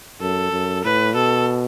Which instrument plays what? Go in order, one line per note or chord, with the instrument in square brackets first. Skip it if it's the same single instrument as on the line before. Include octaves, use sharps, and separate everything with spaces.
[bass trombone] F#2 [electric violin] A4
[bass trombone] F#2
[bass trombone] A2 [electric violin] B4
[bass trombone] B2 [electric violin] A4